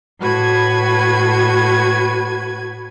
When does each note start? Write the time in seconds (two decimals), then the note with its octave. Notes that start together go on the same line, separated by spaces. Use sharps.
0.19 A2 F#4 B4 G#6